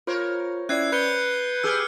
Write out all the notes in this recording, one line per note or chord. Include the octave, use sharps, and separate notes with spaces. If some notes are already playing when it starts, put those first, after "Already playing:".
F4 A#4 C5 C#5
C#4 E4 D5 F#6 G#6 C7
B4 B5 G6 C#7 G7
G4 G#4 E6 F6